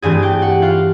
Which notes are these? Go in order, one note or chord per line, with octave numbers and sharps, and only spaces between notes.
G2 E3 A3 C4 G#4 G#5
G4 G5
F#4 F#5
F4 F5